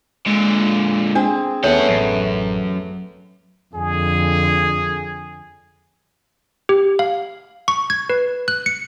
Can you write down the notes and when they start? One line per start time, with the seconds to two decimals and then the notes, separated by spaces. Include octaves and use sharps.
0.26 A#2 D3 G#3
1.15 C4 D4 G#4
1.64 D#2 A3 B3 C#4 G#4 C#5 F#5
1.88 A1 F#2
3.75 F2 D3 G#4
6.69 G4
6.99 F5
7.68 C#6
7.90 G#6
8.10 B4
8.48 F#6
8.66 C#7